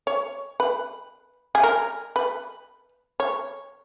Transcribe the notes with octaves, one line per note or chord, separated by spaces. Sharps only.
C#5
B4
G#4
A#4
B4
C#5